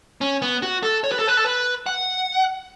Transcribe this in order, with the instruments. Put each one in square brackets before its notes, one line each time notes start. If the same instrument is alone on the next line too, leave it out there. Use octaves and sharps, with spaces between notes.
[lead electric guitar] C#4
B3
F#4
A4
C#5
B4
A4
B4
A4
B4
F#5